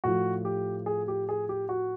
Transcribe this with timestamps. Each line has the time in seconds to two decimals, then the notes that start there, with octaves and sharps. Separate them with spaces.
0.04 A2 F3 F#4
0.45 G4
0.86 G#4
1.08 G4
1.29 G#4
1.49 G4
1.69 F#4